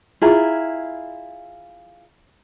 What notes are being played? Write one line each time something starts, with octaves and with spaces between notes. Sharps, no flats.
E4 F4 G#4 A#5